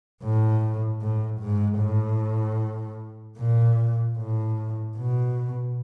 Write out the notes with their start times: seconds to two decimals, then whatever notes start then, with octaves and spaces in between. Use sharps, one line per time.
0.23 A2
1.02 A2
1.41 G#2
1.80 A2
3.38 A#2
4.18 A2
4.97 B2